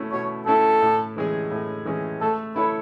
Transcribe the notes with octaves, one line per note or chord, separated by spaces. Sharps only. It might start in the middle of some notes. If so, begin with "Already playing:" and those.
Already playing: B2 A3 C#4 E4
B2 C#5
A3 C#4 E4 A4
A2
E3 G#3 C#4 G#4
A2
E3 G#3 C#4 G#4
A3 A4
E4 A4 B4 C#5